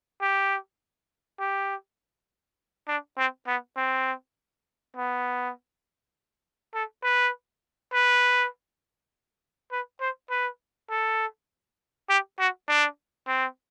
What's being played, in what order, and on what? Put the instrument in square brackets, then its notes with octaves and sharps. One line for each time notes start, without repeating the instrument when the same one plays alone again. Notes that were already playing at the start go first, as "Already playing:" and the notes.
[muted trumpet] G4
G4
D4
C4
B3
C4
B3
A4
B4
B4
B4
C5
B4
A4
G4
F#4
D4
C4